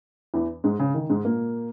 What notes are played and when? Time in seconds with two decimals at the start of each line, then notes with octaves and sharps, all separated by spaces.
0.34 E2 E3
0.64 G#2 G#3
0.79 C#3
0.94 D#3
1.09 G#2 G#3
1.25 A#2 A#3